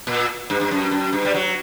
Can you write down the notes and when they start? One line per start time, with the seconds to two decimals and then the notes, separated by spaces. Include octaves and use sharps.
0.07 A#2
0.50 G2
0.61 G2
0.71 F#2
0.91 F#2
1.13 G2
1.25 G3
1.34 F#3